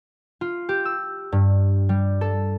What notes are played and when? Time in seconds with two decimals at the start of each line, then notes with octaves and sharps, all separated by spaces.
0.41 F4
0.69 G4
0.85 E6
1.32 G2
1.89 G3
2.21 A4